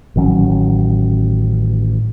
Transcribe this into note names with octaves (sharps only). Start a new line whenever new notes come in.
A1 D#3 F#3 C#4